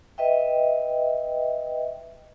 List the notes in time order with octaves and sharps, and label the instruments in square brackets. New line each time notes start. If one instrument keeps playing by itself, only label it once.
[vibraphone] B4 D#5 E5 G5